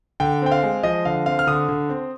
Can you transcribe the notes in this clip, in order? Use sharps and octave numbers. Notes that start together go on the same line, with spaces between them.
D3 G5
C4 G5
F5
G#3
F3 D#5
D3 F5
C4 F5
F6
D3 D#6
D3
C4